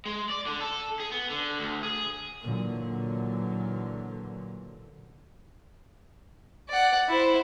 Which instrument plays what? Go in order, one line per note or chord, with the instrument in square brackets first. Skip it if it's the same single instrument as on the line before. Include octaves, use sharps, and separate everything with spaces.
[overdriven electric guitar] G#3
D5
D3
A4
G#4
B3
D3
D2
G#4
[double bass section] A#2 D3 E3 F#3
[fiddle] D5 F#5
E4 C5